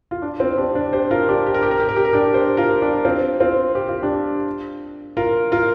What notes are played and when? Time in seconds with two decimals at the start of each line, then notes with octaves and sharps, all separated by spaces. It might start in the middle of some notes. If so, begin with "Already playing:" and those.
0.11 F4
0.22 D4
0.40 C4 F4
0.58 D4 G4
0.75 D4
0.93 G4 C5
1.11 F4 A#4
1.29 D4 G4
1.46 G4
1.54 A#4
1.63 G4
1.71 A#4
1.80 G4
1.89 A#4
1.96 G4
2.05 A#4
2.13 D4 G4
2.34 G4 C5
2.57 F4 A#4
2.82 D4 G4
3.05 C4 F4
3.40 C4 F4
3.75 G4
3.89 F4
4.02 D4 G4
5.17 F4 A#4
5.52 F4 A#4